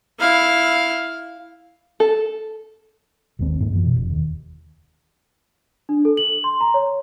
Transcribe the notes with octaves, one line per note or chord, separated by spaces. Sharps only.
E4 F5
A4
G#1 D#2 C4
G#2 A#3
F#2 E3
B2
F1
D#2
D4
A4
F#7
C6
A#5
C#5